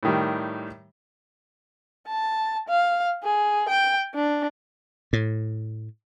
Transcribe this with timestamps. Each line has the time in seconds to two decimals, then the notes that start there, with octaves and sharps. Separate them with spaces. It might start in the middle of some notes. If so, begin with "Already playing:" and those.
0.03 A2 D#3 G3
2.08 A5
2.69 F5
3.23 G#4
3.69 G5
4.15 D4
5.13 A2